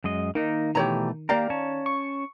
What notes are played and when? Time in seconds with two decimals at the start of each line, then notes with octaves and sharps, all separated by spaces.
0.04 F#2 G#3 D#5
0.35 D#3 A#3 D#4
0.75 B2 E3 A3 G4 C#5 A#5
1.29 A#3 G4 A#4 D5 F5 A#5
1.50 C#4 C#5 A5
1.86 C#6